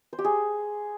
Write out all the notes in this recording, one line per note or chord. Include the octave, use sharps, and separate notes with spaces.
C5
G4
G#4